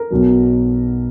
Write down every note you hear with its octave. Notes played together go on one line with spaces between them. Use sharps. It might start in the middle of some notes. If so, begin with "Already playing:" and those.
Already playing: A#4
B1 B2 F#3